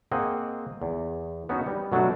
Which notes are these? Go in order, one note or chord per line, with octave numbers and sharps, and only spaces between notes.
A#3 C4 G#4 D#5 F#5
E2
B3 C#4 D#4 F#4
G3
B2 F#3 A3 D4 F#4